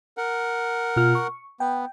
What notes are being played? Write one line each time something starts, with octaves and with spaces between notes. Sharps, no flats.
A#4 F#5
B2 F4 F6
C#6
B3 G5